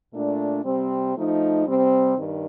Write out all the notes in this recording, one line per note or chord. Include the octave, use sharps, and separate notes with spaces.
A#2 A3 D4
C3 G3 C4
F3 A3 D#4
C3 G3 C4
G2 D#3